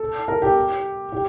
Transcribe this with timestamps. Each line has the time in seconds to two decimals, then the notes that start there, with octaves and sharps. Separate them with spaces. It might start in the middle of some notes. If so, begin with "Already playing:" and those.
Already playing: A4
0.28 A#4
0.42 G4
1.12 G4